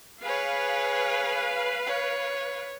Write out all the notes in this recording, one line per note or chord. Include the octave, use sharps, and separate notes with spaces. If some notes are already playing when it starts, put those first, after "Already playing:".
G#4 B4 C#5 F5
C#5